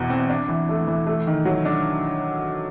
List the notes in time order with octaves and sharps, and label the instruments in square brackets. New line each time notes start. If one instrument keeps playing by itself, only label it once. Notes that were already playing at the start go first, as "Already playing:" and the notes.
Already playing: [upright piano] E2 B2
C4
D4
E3
A3
E3
A3
D#3
F#3
D4